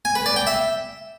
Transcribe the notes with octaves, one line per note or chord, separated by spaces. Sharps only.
G#5
B4
D5
G5
E5